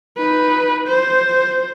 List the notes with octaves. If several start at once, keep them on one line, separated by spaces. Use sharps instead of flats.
D#4 B4
C5